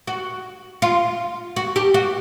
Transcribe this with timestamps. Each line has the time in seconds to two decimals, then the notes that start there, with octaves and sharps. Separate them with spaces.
0.07 F#4
0.82 F4
1.56 F#4
1.76 G4
1.94 F#4